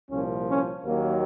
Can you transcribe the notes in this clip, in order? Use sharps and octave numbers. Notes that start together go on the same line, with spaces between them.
C2 A#2 F3 C#4
C#4
D#2 D#3 F#3 A#3